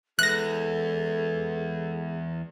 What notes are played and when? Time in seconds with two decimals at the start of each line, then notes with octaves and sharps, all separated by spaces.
0.19 E2 G#3 A4 F#6 A#6